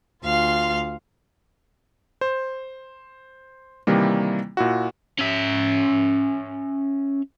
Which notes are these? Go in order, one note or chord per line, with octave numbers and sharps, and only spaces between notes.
D2 F4 F5 C6
C5
C3 D#3 E3 G3 A#3
A#2 E4 F#4
C#4 E5